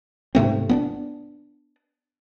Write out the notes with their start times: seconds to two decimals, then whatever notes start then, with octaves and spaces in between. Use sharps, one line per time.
0.35 G#2 C3 A3 C4
0.69 B3 C#4 D4